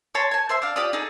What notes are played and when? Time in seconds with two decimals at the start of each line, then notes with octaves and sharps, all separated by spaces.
0.15 C#5 A5 A#5 C6
0.31 G#5 A5
0.49 C5 E5 C6
0.62 D4 F5
0.76 F4 G4 D5 D#6
0.93 D#4 G#4 A4